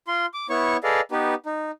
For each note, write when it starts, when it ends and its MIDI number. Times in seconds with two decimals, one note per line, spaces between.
0.08 0.26 65
0.08 0.26 84
0.34 0.47 86
0.49 0.77 59
0.49 0.77 64
0.49 0.77 73
0.49 0.77 85
0.84 1.01 68
0.84 1.01 69
0.84 1.01 71
0.84 1.01 74
0.84 1.01 75
0.84 1.01 77
1.12 1.34 59
1.12 1.34 63
1.12 1.34 67
1.12 1.34 71
1.46 1.71 63